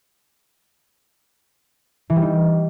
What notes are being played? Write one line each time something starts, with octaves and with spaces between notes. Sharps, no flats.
E3
G3
D#4